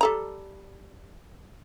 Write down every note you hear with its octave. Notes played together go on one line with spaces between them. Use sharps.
G3 A4 A#5